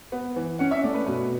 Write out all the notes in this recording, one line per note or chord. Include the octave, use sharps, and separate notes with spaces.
B3
E3
C#4 F#5
E5
A3 D5
B4
B2 B4